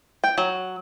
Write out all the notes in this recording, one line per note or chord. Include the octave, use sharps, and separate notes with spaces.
G5
F#3